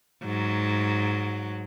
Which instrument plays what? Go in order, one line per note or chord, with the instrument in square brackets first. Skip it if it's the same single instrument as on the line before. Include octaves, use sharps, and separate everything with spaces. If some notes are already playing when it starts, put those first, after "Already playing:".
[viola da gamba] G#2 F#3